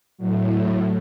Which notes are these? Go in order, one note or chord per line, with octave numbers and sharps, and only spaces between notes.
A2 F#3